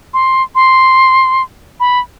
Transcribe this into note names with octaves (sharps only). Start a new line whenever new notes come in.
C6
C6
B5